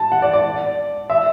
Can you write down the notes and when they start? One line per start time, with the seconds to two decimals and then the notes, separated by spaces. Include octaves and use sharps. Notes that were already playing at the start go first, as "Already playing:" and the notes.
Already playing: A5
0.12 F#5
0.22 D5
0.33 D5
1.10 E5